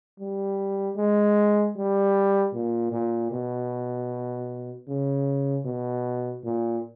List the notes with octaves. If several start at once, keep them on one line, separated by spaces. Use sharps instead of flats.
G3
G#3
G3
A#2
A#2
B2
C#3
B2
A#2